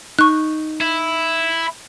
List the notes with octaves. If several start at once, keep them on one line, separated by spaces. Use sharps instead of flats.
D#4 C#6 F#6
E4